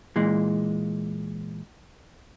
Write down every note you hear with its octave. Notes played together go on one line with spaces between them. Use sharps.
A#2 E3 G#3